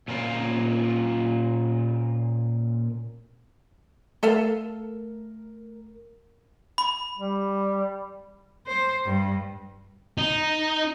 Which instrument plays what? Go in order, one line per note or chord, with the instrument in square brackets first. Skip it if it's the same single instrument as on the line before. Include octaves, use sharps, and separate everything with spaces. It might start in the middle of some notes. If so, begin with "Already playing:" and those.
[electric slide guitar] A#2 C#4 F4 A#4 C5 F5
[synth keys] A3 A#4 [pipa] A4 E5 F5
[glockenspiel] B5
[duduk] G3
[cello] C5
G2
[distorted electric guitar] D#4